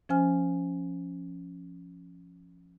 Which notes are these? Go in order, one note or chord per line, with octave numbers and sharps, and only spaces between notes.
F3 C#4 C5 G#5 F6